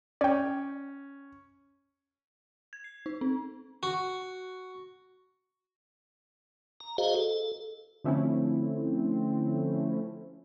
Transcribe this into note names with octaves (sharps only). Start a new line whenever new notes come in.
C#4 D5 G5
G#6
C7
D#4
C4
F#4
A#5
F#4 G#4 C5 D#5 F5
A4
D3 F3 A3 C4 C#4 E4